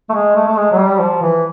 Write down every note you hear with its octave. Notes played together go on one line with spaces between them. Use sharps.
A3
G#3
A3
A3
G#3
F#3
G3
F3
E3